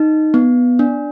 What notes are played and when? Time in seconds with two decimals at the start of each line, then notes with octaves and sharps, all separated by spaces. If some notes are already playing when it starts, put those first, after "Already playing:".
Already playing: D#4
0.34 B3
0.79 D4